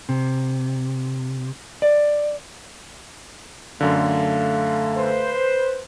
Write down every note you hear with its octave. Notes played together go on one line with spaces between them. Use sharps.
C3
D5
F#2 D3 A3 F5
B4 C5